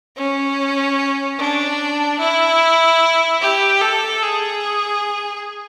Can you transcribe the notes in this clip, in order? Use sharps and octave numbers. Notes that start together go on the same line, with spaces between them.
C#4
D4
E4
G4
A4
G#4